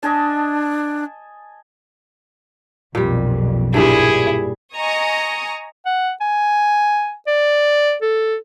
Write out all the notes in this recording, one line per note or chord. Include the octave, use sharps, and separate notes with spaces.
D4 D#5 G#5 A5
B1 F2 A#2 G3
G2 A#2 G3 E4 G#4
D#5 G#5 A#5 C#6 D#6
F#5
G#5
D5
A4